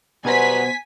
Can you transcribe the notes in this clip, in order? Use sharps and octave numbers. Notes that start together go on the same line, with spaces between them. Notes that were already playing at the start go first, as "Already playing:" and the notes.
B2 F#3 G3 B3 C5 G#5 B6